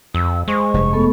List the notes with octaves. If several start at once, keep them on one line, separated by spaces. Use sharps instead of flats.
F2 E6
G#3 C5 C#6
F1 G2
A3 B3 A4